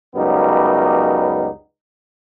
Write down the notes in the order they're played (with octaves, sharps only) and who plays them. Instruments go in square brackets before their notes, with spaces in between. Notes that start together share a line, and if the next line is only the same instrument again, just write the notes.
[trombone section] C#2 F#2 G3 B3 D#4